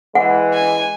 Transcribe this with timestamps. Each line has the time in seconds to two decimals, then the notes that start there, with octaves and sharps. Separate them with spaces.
0.15 E3 G#3 F#5
0.54 G#5